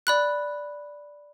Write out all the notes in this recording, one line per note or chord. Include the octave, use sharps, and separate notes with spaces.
D5 B5 F#6